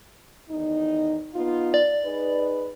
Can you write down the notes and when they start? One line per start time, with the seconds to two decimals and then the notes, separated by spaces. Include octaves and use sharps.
0.50 E2 D#3 D#4
1.35 B3 D#4 F4
1.74 D5
2.05 D#4 G#4 B4